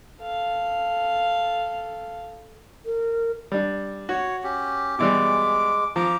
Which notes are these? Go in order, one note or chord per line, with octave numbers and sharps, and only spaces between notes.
A4 F5
A#4
G3 D4
F#4 C#5
C#4 G4
B2 E3 G3 G#3 D6
F3 A#5 D6